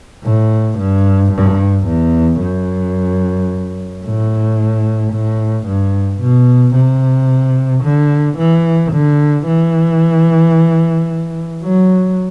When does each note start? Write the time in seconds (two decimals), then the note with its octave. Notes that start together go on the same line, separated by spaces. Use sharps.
0.24 A2
0.79 G2
1.33 G2
1.87 E2
2.42 F#2
4.05 A2
5.13 A2
5.67 G2
6.21 B2
6.76 C3
7.84 D3
8.38 E3
8.93 D3
9.47 E3
11.64 F#3